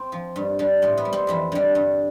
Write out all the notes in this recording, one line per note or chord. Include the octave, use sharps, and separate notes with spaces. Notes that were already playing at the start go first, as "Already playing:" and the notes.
Already playing: C4
F3
G2
D3 G3
A2 C4
B3
G3
C4
F2 E3 E4
D3 G3
G2